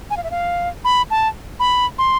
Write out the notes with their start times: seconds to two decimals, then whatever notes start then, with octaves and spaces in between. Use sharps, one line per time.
0.10 G#5
0.17 F5
0.24 E5
0.31 F5
0.85 B5
1.10 A5
1.60 B5
1.98 C6